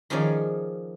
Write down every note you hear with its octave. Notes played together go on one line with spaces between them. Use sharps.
D#3 F3 C#4 D#4 G#4 D5